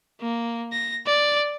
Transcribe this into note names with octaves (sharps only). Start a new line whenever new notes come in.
A#3
A#6
D5